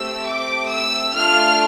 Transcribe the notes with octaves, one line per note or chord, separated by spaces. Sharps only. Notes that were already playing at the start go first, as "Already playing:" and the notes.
Already playing: A3 C4 G4 E6
D6
E6
A3 D4 F4 A4 F6